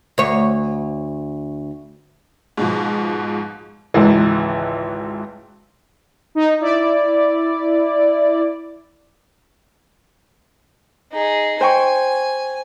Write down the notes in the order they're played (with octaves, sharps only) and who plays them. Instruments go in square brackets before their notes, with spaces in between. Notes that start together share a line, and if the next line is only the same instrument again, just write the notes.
[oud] D2 C#5
[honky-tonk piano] G#2 B2 F3
[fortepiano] G#1 C#2 E3
[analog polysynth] D#4
E4 D5
[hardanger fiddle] D#4 G#4
[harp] C5 G5 C#6 [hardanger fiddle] G#5